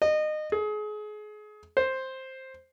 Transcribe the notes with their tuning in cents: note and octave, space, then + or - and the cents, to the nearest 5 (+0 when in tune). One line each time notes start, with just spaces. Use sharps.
D#5 -25
G#4 +30
C5 +5